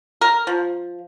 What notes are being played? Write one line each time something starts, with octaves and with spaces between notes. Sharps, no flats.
A#4
F3